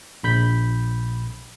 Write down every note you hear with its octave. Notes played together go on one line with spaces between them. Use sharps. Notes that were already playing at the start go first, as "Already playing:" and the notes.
A#1 B5 G6 B6